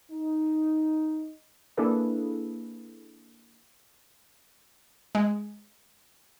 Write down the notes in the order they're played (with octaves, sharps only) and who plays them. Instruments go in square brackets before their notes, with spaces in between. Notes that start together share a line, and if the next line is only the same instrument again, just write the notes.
[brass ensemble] D#4
[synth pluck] A#3 D4 E4 G#4 A4 B4
[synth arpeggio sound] G#3